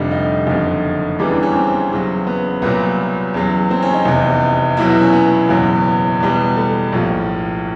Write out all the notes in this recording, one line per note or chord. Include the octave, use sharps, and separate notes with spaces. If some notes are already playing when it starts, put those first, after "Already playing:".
Already playing: F1 F2 D3 G3 D#4
D#4
F#1 F2 D3
E2 C#3 E3 G3 D4
D4
C#4
C4
E2 C#3 F#3
B3
C2 A#2 F#3 B3
E2 C#3 F#3
C4
C#4
D#4
F1 E2 C3
E2 B2 F#3 E4
F#4
C#4
B3
F#1 E2 B2 F#3
E2 B2 G3
A3
A#1 A2 F3